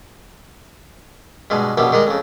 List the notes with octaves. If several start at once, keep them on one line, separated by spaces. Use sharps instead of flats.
G2 B2 G#3
A#1 F#2 B2 B3 G4
D#3 G3 G#3 A#4 D#5
F2 C#3